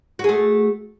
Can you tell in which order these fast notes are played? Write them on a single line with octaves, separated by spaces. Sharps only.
F#4 G#4 A3